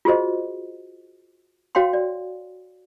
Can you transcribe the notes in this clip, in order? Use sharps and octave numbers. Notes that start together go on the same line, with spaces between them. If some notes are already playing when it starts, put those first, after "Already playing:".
F4 F#4 G#4 C5 D#5
F#4 C#5 F5 G5 C6
D5